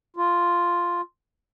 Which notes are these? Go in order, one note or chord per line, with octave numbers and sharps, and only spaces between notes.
F4